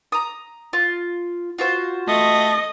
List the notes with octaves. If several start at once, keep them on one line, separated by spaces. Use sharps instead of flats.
A#5 D#6
F4
F4 F#4 C5
A3 D#5